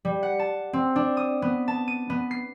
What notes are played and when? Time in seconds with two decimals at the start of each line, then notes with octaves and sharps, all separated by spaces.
0.05 G3
0.23 F#5
0.39 A5
0.73 C4
0.96 D4
1.17 D#6
1.42 B3
1.68 A5
1.88 D#7
2.10 B3
2.31 C7